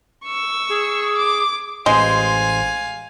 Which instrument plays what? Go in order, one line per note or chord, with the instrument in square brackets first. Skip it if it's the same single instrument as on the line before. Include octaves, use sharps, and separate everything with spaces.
[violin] C#6 E6
[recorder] G#4
[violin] D6
[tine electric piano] A1 C5 C6 [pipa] G#3 [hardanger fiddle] F5 G#5